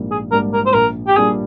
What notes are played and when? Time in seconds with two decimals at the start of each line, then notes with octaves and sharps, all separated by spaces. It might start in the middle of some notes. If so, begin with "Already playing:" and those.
Already playing: A#1 G#2 G3 A#3
0.11 G#4
0.31 G#2 G3 A#3 D4 A#4
0.54 A#4
0.66 C5
0.74 A#1 A#4
1.08 G4
1.17 A#2 G3 D4 G#4